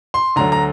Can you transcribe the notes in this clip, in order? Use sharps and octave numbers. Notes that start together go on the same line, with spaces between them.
C6
D2 D3 F#3 A#5
A#5